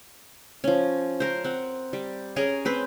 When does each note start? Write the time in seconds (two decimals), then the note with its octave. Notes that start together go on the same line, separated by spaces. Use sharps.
0.64 F3 C#4
1.20 A#4 C5
1.44 C4 F#5
1.93 G3
2.36 C#4 G#4 A#4
2.65 C4 B4 C5